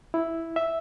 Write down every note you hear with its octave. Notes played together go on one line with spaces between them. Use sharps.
E4
E5